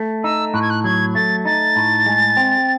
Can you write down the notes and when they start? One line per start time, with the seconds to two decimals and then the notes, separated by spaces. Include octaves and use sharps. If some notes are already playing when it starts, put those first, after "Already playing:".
Already playing: A3
0.24 D#4 E6
0.54 A2 F#6
0.62 G#6
0.70 F#6
0.84 F#3 G#6
1.15 A3 A6
1.45 D#4 A6
1.76 A2
2.06 G#3
2.37 C4